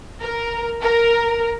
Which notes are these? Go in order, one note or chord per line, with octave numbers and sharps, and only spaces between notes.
A#4
A#4